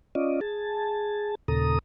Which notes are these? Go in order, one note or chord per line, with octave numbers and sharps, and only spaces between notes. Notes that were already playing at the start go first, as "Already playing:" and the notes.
C#4 F4 D5 D#5
G#4 A5
D#2 A#2 C#3 A4 A#5 D#6